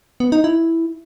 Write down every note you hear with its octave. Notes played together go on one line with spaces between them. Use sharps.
B3
D#4
E4